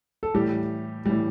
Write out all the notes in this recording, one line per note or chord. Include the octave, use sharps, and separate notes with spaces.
A4
A2 E3 G3 G4
A2 E3 G3